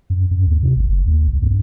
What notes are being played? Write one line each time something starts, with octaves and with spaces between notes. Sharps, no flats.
F#2
F#2
D#2
C3
G#1
F#1
D#2
C2
G2